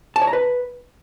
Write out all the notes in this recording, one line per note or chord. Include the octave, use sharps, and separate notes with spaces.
A5
C#5
A#5
B4